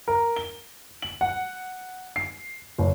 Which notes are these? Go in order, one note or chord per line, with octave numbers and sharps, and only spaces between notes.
A#4
G7
F#7
F#5
C7
F#1